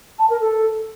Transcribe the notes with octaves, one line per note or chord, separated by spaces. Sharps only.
A5
A#4
A4